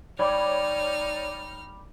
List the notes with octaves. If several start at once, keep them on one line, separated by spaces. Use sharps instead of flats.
G3 D#4 C#5 D5 B5 D6 F6